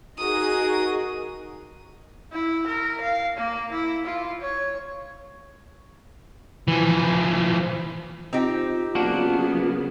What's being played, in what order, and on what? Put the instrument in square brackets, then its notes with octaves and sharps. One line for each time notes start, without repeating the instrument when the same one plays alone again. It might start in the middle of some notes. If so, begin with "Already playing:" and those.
[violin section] D#4 G#4 A#4 [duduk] F#4 [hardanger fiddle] D#6
[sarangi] E4
A#4
F5
A#3
E4
F4
C#5
[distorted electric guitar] E3 F3
[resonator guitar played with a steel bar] C4 D#4 G4 [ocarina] F4
[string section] C#3 F#3 B3 [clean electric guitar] A#3 D4 F#4